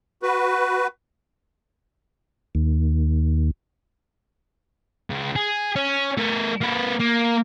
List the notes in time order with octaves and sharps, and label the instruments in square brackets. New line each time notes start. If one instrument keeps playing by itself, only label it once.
[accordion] F#4 B4
[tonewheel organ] D#2
[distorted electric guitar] C#2
G#4
C#4
A3 A#4
A#3 B4
A#3